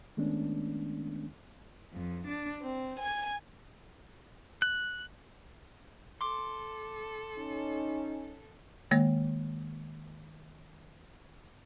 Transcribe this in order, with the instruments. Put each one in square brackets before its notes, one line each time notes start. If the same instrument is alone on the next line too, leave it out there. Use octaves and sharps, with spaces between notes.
[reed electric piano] D#3 G#3 A3 B3 C#4 D4
[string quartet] F2
D4
C4
G#5 G#6
[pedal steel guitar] F#6
[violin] A4 [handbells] C6 D6
[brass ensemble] C#4 D#4
[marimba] D#3 G#3 A#3